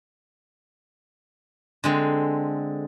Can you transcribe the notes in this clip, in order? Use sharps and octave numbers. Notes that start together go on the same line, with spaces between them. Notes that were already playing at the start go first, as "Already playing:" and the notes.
D3 G#3 C4